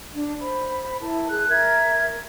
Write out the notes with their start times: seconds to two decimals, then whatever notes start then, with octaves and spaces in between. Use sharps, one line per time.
0.15 D4
0.41 C5 B5
1.01 E4 A#4 A5
1.29 G#4 F#6
1.49 A#4 E5 G#6